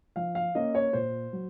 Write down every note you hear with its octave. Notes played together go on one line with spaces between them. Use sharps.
F3 F5
F5
A#3 C#4 D#5
C#5
A#2 C5
F#3